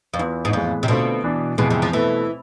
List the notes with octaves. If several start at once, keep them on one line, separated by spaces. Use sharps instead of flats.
F2
E2 E3 B3 F4
G#2
F2 A2 E3 G#3 B3
C3
B2 D3 A3 C4 F4
E3 B3 D4
F2 B2 E3 G#3 B3
C3
F3
B2 E3 A3 E4 B4